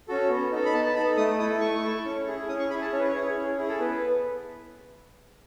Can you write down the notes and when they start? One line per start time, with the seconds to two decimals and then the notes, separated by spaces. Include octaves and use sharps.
0.08 C#4 F#4 A4
0.29 B3
0.52 D#4 A4
0.66 B5
0.74 B3 A5
0.85 A5
0.95 D#4 B5
0.99 A4
1.17 A3 D#6
1.39 E4 A4 D#6
1.60 A3 C#6
1.83 E4 A4
2.05 C#4
2.27 E4 G#4
2.48 C#4 D#6
2.59 C#6
2.70 E4 G#4 B5
2.81 A5
2.92 C#4 C#5
2.99 B4
3.08 C#5
3.15 E4 G#4
3.36 C#4
3.58 E4 G#4
3.69 A4
3.80 B3 B4